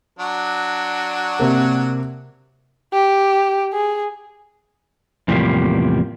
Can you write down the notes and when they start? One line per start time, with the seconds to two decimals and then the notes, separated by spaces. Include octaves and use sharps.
0.19 F#3 D4 F#4
1.40 C3 A#3
2.93 G4
3.73 G#4
5.28 E2 A2 C3 F3 G3 A#3